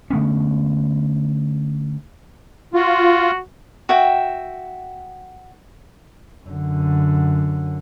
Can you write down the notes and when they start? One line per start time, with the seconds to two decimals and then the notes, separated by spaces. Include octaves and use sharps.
0.10 D3 A3 B3 C#4
2.74 F4 F#4
3.89 F#4 E5 G5
6.46 F#2 D3